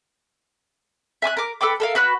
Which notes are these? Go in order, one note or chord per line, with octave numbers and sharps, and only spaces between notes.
E5 G#5 D6 F#6
A#4 D6
A4 B4 G5 D6
A4 A#4 F5
F#4 B4 B5 F#6